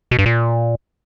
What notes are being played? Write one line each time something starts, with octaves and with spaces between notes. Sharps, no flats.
B2
G2
A#2